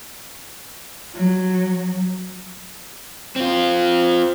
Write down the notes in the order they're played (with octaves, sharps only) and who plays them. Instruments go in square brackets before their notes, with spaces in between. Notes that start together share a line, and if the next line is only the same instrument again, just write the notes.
[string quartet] F#3
[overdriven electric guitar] C4 F4